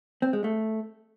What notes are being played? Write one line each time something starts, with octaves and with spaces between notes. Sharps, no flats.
C4
G#3
A3